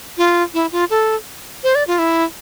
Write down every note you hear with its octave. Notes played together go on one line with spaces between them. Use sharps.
F4
E4
F4
A4
C5
D5
F4
E4